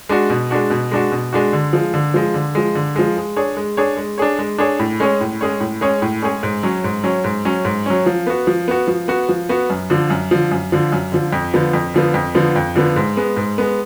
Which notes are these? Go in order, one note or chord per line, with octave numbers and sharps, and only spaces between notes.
G#3 D4 F#4
B2
G#3 D4 F#4
B2
G#3 D4 F#4
B2
G#3 D4 F#4
D3
F3 G#3
D3
F3 G#3
D3
F3 G#3
D3
F3 G#3
G#3
D4 G#4 C#5
G#3
D4 G#4 C#5
G#3
D4 G#4 C#5
G#3
D4 G#4 C#5
A2
G#3 C#4 G#4 C#5
A2
G#3 C#4 G#4 C#5
A2
G#3 C#4 G#4 C#5
A2
G#3 C#4 G#4 C#5
G#2
F#3 C#4
G#2
F#3 C#4
G#2
F#3 C#4
G#2
F#3 C#4
F3
B3 F#4
F3
B3 F#4
F3
B3 F#4
F3
B3 F#4
F#2
D3 F3
F#2
D3 F3
F#2
D3 F3
F#2
D3 F3
F2
D3 F3 B3
F2
D3 F3 B3
F2
D3 F3 B3
F2
D3 F3 B3
G#2
G#3 B3
G#2
G#3 B3